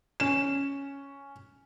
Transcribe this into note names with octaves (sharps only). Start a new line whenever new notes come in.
C#4 E7